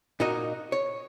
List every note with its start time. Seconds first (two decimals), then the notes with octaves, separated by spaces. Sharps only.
0.20 A#2 D#4 F#4 A#4 D#5
0.72 C#5